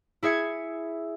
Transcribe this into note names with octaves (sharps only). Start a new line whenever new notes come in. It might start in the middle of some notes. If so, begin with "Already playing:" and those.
E4 G#4 E5 G#6 C#7